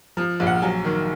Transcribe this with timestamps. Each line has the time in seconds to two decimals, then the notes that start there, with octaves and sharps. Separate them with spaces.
0.17 F3
0.40 A#1
0.47 F#5
0.62 F#3 G#5
0.84 D#3